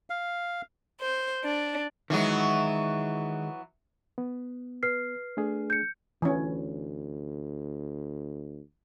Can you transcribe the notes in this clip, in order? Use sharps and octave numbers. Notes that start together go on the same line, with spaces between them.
F5
C5
D4
D#3 E3 F#3 G#3 B3
B3
B4 F6 C7
A3 D4 G#4
G6 C#7
D2 E3 C#4